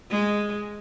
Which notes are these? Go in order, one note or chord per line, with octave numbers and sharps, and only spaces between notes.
G#3